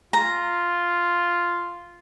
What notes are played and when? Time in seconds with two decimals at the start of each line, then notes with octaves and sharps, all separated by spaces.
0.13 F4 A#5